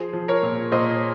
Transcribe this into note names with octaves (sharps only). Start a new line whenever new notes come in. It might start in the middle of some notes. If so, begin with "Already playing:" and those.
Already playing: F3 G#4 C5
F3
A#4 C#5
A#2
A#2 C5 D#5